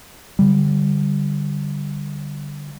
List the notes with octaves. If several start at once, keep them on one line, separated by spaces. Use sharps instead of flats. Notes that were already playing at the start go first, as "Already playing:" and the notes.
D3 G3